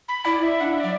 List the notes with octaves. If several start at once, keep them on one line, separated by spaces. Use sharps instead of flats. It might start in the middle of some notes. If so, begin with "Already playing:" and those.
B5
E4 D5
E5
D4 F#5
E5
F#3 D5